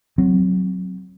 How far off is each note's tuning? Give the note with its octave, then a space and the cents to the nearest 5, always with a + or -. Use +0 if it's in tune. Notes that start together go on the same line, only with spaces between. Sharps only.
F#3 +0 C4 +0